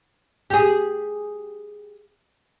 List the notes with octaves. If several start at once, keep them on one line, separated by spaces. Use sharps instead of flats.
G4 G#4